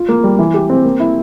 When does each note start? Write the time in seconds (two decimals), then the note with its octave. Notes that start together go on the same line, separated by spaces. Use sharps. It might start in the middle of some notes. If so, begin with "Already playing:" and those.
Already playing: F4
0.09 A#3
0.24 G3
0.39 E3
0.54 G4
0.70 C4
0.85 A#3
0.99 E4